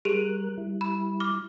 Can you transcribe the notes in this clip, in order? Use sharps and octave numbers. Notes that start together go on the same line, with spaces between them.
G3 G4 G#4 A#4 F#6 F7
G3 E4
B5
D6 F6